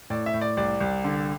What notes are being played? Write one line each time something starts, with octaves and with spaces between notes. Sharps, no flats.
A2 D5
E5
A2
D5
C2 D5
C2
D3